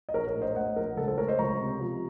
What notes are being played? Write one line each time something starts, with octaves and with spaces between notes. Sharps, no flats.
D#5
A#1 A#4 C#5
A#4 C#5
A2
C5 D#5
A3 D#5 F#5
A#1 A#4
C#2 A4
A4 C5
A3 A#4 C#5
C5 D#5
C#2 A#5 C#6
C3
F3